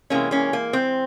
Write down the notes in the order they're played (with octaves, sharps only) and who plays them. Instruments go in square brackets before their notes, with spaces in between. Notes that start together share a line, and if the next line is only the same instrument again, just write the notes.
[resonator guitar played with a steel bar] C3 E3 G#3 A#3 C#4
A#3 C#4
A#3
C4